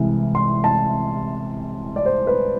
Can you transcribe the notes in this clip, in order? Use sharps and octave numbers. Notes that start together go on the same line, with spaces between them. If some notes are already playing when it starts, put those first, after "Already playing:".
Already playing: C2 C3 E3 G#3
C6
A5
D5
C5
B4